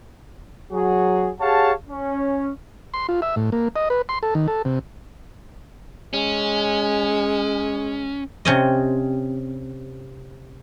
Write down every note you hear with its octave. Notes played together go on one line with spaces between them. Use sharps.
F#3 F#4 G#4
G4 G#4 C#5 F5 F#5 A5
C#4
C6
F4
E5
A2
A#3
D#5
B4
C6
A4
D#3
A4
C3
G#3 C#4
C3 C#4 D#5